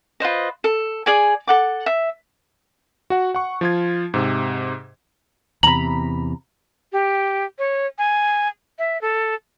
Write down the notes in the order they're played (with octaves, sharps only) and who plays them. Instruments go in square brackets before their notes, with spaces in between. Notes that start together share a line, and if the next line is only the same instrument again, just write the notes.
[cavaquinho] F4 B4 C5 D#5
A4
G#4 D5 G#5
A4 F#5 D6
E5
[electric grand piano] F#4 F#5
F#5 C#6
F3 F4 G#6
G#2 C3
[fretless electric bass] E2 C3 [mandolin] A#5 B5 [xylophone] F#7
[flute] G4
C#5
G#5
E5
A4